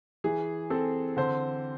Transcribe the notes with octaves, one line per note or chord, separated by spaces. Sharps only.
E3 G#4
C4 A4
D3 C5